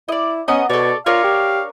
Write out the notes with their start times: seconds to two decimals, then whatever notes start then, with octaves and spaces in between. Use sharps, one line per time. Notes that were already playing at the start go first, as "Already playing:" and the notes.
0.09 E4 D5 D#5
0.48 B3 C#4 D#5 A#5
0.70 B2 A4 C#5 D5
1.06 D4 F4 A#4 C#5 F5
1.24 G4